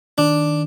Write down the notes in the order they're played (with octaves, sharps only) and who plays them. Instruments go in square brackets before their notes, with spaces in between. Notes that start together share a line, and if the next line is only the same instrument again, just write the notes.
[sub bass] D#3 [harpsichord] D4